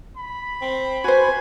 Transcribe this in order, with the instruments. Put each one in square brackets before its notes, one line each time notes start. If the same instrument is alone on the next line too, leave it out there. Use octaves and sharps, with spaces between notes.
[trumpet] B5
[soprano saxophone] C4
[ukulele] F#4 C5 [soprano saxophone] G#5